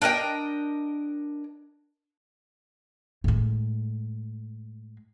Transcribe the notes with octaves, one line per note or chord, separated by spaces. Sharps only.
D4 A#4 D#5 G5
A2 G#3